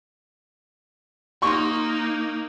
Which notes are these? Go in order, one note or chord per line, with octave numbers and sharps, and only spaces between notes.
A#3 D#4 C6 C#6